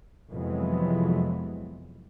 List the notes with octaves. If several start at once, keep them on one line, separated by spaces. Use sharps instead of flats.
F2 C3 E3 F#3 G#3 B3